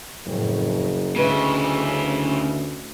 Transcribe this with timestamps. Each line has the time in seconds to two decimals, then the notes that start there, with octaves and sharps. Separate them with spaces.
0.25 F#1 F2 A2
1.16 D2 C#3 C#4 E4 B4 D#5